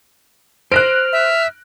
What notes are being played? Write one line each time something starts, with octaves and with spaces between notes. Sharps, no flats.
C5 F6 F#6 A#6 D7
E5